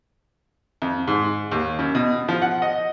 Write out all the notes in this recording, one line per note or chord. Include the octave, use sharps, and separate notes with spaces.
F2
G#2
D#2
F#2
B2
F3
F#5
D#5